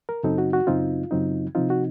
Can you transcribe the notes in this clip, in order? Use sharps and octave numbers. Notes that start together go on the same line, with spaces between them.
A#4
F#2 C#3 F#3 C4 D#4 A4
F#4
F#4
F#2 C#3 F#3 C4 D#4 F4
F#2 C#3 F#3 C4 D#4
C3 F3 C4 D#4 F4
F#4